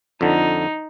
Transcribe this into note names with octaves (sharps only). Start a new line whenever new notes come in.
F2 D3 D#4